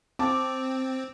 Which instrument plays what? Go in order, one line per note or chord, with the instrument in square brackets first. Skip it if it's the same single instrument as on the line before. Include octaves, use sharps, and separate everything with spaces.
[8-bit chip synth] C4 [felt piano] A5 D6